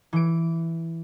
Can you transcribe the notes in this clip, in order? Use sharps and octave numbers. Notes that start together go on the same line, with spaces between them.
E3 D7